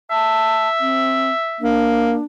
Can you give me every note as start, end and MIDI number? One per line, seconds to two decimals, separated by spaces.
0.11 1.73 76
0.11 0.68 81
0.80 1.31 60
1.61 2.19 58
1.61 2.24 62